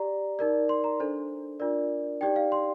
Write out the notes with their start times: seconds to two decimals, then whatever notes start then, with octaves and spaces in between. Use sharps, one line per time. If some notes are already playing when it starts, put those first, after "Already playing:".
Already playing: G4 D5 A#5
0.39 D#4 A#4 D5
0.69 C6
0.84 A#5
1.00 D4 A4 C5
1.60 D4 F4 A#4 D5
2.21 D#4 G4 D5 G5
2.36 F5
2.52 C6